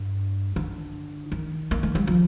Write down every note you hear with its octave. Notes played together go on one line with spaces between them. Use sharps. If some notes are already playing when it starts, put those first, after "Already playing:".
Already playing: G2
D3
D#3
A#3
A3
G3
F3